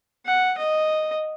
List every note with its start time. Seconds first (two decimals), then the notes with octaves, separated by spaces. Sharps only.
0.26 F#5
0.58 D#5